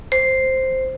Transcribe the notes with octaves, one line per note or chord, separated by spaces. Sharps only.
C5